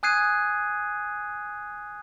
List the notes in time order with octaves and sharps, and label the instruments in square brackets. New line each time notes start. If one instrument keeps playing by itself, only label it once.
[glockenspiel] G#5 D#6 F#6 G#6 C7 D#7